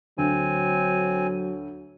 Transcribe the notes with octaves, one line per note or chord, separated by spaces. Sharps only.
D2 F#3 C4 G#5